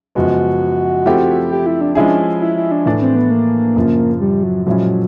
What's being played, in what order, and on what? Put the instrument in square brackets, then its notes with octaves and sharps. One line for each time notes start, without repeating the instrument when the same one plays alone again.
[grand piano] F#2 C#3 F3 G#3 B3 [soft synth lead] F#4
[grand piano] F3 A3 C4 E4 G4
[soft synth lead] G4
E4
D4
[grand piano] F3 G#3 C#4 E4 G#4 [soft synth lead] D4
[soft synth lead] E4
E4
D4
[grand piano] A2 E3 A3 D4
[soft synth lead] C4
B3
A#3
[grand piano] F#2 C#3 F3
[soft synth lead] G3
F#3
[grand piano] A#2 F3 G#3 C#4 E4 [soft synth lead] F#3